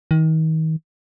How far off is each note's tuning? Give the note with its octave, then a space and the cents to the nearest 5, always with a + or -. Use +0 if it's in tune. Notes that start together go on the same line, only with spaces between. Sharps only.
D#3 +35